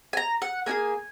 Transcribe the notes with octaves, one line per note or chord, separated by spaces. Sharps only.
G#5
A#5
F#5
A#3 D#4 G#4 G#5